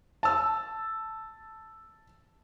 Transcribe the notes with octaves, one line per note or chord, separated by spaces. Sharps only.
A5 E6